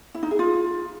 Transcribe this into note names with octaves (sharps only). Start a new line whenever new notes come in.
E4
D#4
G#4
F4